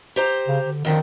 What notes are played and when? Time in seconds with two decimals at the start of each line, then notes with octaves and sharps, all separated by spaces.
0.16 G4 C5 A#5
0.48 C#3
0.66 D3
0.85 F2 D3 D#3 F3